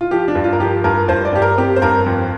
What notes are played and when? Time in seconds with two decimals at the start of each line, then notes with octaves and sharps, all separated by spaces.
0.01 F4
0.11 F3 G4
0.28 D4
0.35 G2
0.44 F4
0.53 A#4
0.60 F3 G4
0.84 G2 A#4
1.08 G2 C5
1.25 D5
1.33 G2 G4
1.42 A#4
1.58 C4 G4
1.76 C5
1.82 G2 A#4
2.06 F2